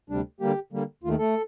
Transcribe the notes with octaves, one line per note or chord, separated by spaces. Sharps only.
D2 C3 G3 D4
D3 G3 A#3 G4
D3 G3 A#3
D#2 D#3 A3 F4
A3 A4